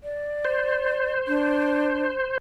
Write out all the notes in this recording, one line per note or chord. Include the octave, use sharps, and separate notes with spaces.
D5
C5
D4